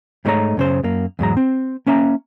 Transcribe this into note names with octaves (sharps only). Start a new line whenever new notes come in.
G#2 G3 A3 D#4 C#5 A#5
F#2 C#3 C5
F#2 A#3
E2 G#2 F#3 A#5
C4
A#3 C#4 E5 A#5